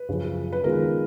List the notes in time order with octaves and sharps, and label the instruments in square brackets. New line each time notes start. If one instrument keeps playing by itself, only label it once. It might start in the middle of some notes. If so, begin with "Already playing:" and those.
Already playing: [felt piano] B4
[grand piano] F#2 C#3 F3
[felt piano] B4
[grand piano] D#3 G#3 B3 F4 G#4 [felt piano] A#4